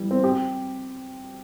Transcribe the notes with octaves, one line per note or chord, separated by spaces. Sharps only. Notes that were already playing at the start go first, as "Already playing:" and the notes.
Already playing: E3 G3
C4
G4